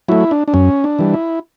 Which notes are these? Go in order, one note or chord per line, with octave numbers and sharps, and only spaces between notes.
F#3 A3 E4
D4
D4
F#2 C#4
D4
E3 G3
E4